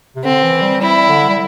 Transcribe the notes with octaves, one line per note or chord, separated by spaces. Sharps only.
C3
D3 C4
E3
G3
G3 E4
D3
G3